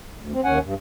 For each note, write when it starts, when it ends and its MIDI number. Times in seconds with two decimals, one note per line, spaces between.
0.19 0.33 38
0.33 0.41 60
0.44 0.59 39
0.44 0.59 61
0.44 0.59 78
0.44 0.59 80
0.64 0.74 43